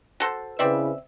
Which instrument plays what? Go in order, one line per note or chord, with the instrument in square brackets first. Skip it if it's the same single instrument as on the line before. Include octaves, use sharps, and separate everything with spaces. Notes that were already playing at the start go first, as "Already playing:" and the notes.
[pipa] F#4 A4 C5
[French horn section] C#3 E4 B4 [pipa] C4 D5 E5